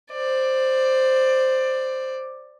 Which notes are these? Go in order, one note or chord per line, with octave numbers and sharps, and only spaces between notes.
C5 D5